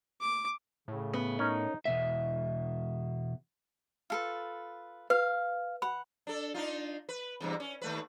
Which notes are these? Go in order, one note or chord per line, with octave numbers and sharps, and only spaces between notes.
D6
A2 C#3
B3
C#4 D#4 A#4
E2 B2 E5
F4 A4 B4
B4 F5
F#5 B5
D4 A4
D4 D#4 F4
B4
E2 G2 C3
C#4
D#2 A3 B4